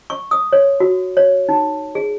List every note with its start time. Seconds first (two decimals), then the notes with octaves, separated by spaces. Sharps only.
0.10 C#6
0.31 D#6
0.53 C#5
0.80 F#4
1.17 C#5
1.49 D#4
1.95 G#4